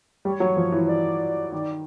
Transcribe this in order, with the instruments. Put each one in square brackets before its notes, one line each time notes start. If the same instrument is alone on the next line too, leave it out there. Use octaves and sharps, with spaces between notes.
[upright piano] G3 [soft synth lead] C#5
[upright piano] F#3
F3
E3
[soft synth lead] C#5
D5
[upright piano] D#3 [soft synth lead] D5